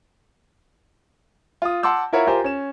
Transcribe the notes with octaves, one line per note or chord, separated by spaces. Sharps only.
F4 D#6
F#5 A5 C6 D6 E6 G6
E4 F4 A#4 C#5 E5 F#5
F4 G4 A#4 C5 G#5
C#4 E7